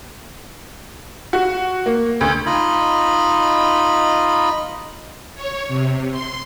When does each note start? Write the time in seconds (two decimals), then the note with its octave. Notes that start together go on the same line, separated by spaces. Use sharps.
1.33 F#4
1.86 A#3
2.21 D2
2.46 D#4 F4 D#5 B5
5.35 C#5
5.68 C3
6.10 C6